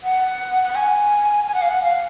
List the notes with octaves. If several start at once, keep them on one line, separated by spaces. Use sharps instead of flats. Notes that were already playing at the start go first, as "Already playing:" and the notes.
F#5
F#5
G#5
G#5
F#5
F5
F#5
F5